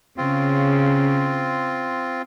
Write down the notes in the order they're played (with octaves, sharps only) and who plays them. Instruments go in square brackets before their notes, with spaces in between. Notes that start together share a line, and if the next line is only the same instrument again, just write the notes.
[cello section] C#3 [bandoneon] C4 F4